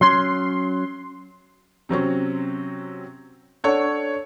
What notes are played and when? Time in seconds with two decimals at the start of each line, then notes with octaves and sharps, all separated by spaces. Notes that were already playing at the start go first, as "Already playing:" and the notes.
0.01 F#3 C#4 C6
1.89 C3 F#3 C4 C#4
3.64 D4 A4 C#5 F#5